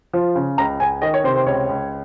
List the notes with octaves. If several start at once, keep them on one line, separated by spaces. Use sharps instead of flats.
F3
C#3
C#2 A#5
C#2 G#5
D#3 D#5
C#5
C3 C5
C5
C#2 C#5
C#2